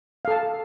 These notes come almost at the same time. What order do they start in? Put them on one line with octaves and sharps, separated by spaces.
F5 A4 A5